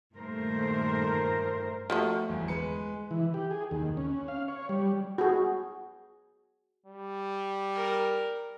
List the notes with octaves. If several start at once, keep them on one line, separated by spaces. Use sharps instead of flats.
G2 A#2 D#3 A3 A#4 C5
F3 A3 F#4
G1 E2
G#3 B4 C#7
E3
G4
G#4
D#2
C#4
F5
C#5
G3
F#4 G#4
G3
A#4